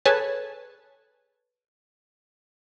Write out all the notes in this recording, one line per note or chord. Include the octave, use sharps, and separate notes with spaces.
G#4 A4 B4 C#5 G#5 A5